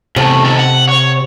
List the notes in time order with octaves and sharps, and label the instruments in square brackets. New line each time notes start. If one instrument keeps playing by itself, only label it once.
[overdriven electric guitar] E2 A3 [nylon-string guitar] C3
[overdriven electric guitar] D#3 A4
F#5
C#5